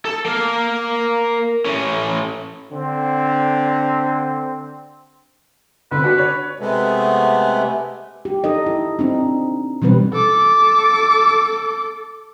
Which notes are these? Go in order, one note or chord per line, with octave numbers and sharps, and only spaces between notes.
A4
A#3 F5
A2 C#4
D3 C4
D3 C4 B4
D4 F#4 F#5
C#5
C3 G#3 A3 B3
G4
D#4 A4 D#5
E4
C4 D4 D#4
B2 E3 G3 C4 B4
A4 D6